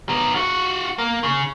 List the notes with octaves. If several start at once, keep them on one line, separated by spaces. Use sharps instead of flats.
B3 A#4
F4 F#4
A#3
C#3